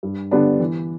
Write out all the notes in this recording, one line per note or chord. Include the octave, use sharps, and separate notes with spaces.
G2
D3 G3 B3 D4
E3